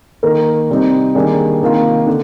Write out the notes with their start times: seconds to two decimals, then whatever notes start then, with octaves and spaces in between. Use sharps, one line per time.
0.23 D#3 A#3 D#4 A#4
0.70 C3 G3 C4 D#4
1.15 D#3 G3 A#3 D4 G#4
1.62 C3 D#3 A#3 F4
2.07 D3